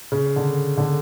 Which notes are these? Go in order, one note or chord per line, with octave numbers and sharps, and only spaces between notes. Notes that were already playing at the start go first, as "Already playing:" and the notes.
C#3
D3
D3